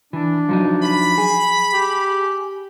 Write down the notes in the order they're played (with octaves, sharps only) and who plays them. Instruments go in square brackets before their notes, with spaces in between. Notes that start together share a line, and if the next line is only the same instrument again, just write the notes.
[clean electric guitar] E3 [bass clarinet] D4
[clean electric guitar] F3 F#3 D#4
[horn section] B5
[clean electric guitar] G#4
[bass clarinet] G4